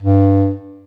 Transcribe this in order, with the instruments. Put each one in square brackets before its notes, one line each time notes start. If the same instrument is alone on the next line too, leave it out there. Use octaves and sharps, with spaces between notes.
[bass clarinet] G2